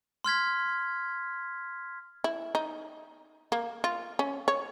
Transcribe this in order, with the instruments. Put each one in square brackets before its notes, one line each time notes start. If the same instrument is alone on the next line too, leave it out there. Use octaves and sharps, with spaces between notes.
[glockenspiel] C6 F6 G#6 B6
[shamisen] E4
D#4
A#3
F4
C#4
C#5